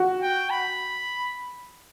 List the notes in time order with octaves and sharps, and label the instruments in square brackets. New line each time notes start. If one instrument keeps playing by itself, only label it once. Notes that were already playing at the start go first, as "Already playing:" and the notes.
Already playing: [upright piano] F#4
[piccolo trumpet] G5
B5